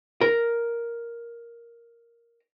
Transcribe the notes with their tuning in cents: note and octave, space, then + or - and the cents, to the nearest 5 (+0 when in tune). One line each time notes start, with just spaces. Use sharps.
A#4 +5